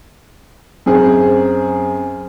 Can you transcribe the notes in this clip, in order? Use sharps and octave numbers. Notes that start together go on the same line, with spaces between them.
F#2 C4 G#4